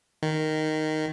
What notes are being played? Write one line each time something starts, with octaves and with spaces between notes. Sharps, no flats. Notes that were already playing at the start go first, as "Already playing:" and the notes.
D#3